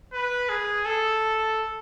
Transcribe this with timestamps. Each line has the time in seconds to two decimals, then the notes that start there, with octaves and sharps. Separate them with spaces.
0.13 B4
0.49 G#4
0.86 A4